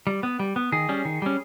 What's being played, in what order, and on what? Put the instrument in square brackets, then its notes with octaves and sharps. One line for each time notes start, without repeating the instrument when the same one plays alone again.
[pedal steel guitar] G3
B3
G3
B3
D#3 G#4
G3 C#4
D#3
G3 C#4